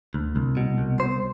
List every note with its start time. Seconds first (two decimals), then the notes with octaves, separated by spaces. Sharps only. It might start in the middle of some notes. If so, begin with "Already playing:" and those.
0.14 D2
0.36 C2
0.57 B2
0.78 C2
1.00 C2 C5